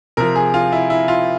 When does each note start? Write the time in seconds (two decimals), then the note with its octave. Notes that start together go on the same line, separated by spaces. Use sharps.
0.17 C3 F3 A#4
0.36 G#4
0.54 F4
0.72 E4
0.90 E4
1.08 F4